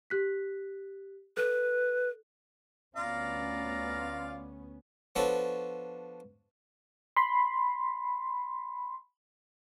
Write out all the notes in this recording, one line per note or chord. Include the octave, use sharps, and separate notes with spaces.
G4 F#6 B6
A4 B4 F#6
D2 B3 C#4 F4 D5 F5 A#5
F3 B3 D4 F#4 A4 C#5
B5 C6